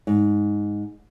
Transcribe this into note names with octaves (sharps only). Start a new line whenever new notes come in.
G#2